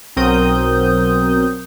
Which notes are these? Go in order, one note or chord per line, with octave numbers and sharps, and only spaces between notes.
B1 F#3 C4 A#4 D#6 G6